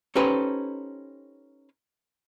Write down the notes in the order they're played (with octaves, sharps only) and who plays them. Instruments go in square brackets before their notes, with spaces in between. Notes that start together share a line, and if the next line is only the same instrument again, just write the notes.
[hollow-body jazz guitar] C#4 D#4 G4 A4 B4 C5